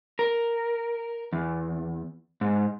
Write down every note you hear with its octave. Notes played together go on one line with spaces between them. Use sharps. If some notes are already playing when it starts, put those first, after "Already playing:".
A#4
E2
G#2